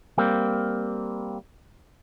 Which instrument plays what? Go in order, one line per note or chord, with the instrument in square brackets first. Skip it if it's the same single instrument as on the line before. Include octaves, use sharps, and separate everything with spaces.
[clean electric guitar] G3 A#3 C4